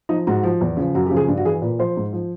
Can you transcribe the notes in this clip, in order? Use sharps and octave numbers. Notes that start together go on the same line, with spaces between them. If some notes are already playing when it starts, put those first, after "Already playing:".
F3 D#4
G#2 F#4
F3
E2
C#3 F3
F#2 F#4
G4
C#3 F3
G#4
G2
F#4
E3 G#4
A#2 B4
F3 C5
G#2
F3